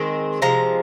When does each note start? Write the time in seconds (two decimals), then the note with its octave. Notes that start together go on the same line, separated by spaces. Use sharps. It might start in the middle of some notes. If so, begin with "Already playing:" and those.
Already playing: D#3 G#3 C4
0.42 C3 F3 G#3 A#5